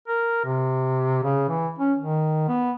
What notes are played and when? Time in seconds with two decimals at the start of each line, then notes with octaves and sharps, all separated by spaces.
0.08 A#4
0.45 C3
1.23 C#3
1.49 E3
1.79 C#4
1.98 D#3
2.48 B3